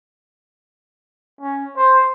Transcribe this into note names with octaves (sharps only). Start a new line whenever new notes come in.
C#4
C5